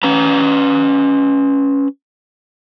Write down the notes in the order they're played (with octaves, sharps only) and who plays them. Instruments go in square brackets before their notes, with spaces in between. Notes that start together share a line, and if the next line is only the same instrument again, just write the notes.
[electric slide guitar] C#4 B4 A#5